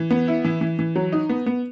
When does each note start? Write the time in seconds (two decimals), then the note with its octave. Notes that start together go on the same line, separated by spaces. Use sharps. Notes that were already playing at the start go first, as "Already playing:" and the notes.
Already playing: E3
0.11 B3
0.28 E4
0.45 E3
0.61 E3
0.79 E3
0.96 F#3
1.12 D#4
1.29 B3
1.46 B3